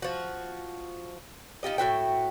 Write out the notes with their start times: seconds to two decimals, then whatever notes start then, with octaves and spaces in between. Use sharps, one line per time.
0.02 F3 F#4
1.63 D#4 F4 G4 D#5
1.78 A2 F#4 E5 G5